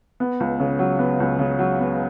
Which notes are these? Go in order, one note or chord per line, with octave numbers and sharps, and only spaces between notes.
B3
C#2
C#3
F#3
B3
C#2
C#3
F#3
B3